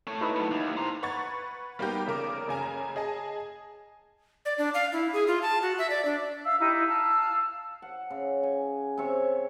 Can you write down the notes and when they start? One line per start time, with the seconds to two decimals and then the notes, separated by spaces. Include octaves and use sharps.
0.07 A3 C#5
0.21 D#4 E4 B4
0.36 F#3 A3
0.51 D#2
0.77 C5 A#5
1.03 B4 F#5 C#6 G#6 A6
1.79 G3 A#3 B3 D#4 G4 A#4
2.06 F1 C#3 A#4 D6
2.47 F#1 C#3 G#5 A#5
2.96 G#4 D#5 G#5 A5
4.45 D5
4.58 D4
4.74 F5
4.93 E4
5.13 G#4
5.27 F4
5.42 A5
5.62 F#4
5.79 E5
5.90 D5
6.05 D4
6.45 E5 F5 E6
6.59 D#4 E4 G4
6.88 F5 A5 E6
7.82 F#5
8.10 C#3
8.43 G#5
8.98 C3 C#5 E5 C#6